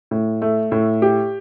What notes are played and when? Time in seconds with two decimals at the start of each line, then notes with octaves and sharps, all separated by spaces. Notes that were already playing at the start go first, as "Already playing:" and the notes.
0.11 A2
0.42 A3
0.72 A2
1.02 G4